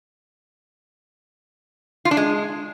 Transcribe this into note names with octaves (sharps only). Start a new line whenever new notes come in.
F4
D4
G#3